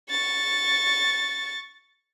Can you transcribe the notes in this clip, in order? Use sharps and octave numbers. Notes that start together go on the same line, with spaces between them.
C#6 A6